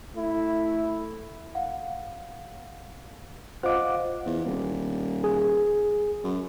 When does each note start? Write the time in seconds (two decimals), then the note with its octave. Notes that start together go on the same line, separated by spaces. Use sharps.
0.16 A3 E4
1.55 F5 F#5
3.63 F4 C5 D#5 F5 F#5 D6
4.26 E2
4.45 D#1
5.24 G#4
6.24 F#2